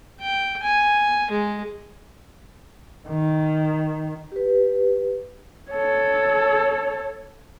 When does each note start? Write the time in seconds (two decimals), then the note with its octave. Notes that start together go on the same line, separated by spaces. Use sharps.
0.20 G5
0.62 G#5
1.31 G#3
3.08 D#3
4.32 G4 B4
5.71 A4 C#5